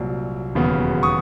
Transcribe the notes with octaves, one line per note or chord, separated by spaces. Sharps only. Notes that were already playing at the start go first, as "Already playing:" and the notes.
Already playing: C2 A#2 F#3
E1 D#2 C#3 F#3 B3
C#6 D#6